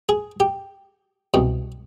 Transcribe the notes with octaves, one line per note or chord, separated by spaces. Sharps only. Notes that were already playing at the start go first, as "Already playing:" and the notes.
G#4
G4
C2 B2